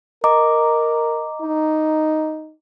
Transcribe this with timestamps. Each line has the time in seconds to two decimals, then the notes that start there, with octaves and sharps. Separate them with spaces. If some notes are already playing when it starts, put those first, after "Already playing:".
0.24 A#4 D#5 A#5 D6
1.42 D#4